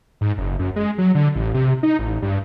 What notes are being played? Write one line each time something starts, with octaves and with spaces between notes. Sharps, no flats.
G#2
F#1
F#2
G#3
F#3
D3
A1
C3
D#4
A1
G2